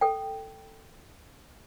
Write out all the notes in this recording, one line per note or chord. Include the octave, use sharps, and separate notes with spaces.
A4 G5